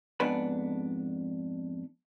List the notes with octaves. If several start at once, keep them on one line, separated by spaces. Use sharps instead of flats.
F2 G#2 B3 D4 B4 B5